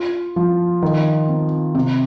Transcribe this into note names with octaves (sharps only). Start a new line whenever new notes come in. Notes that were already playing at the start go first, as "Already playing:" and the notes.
Already playing: F4
F3
D#3
C4
C3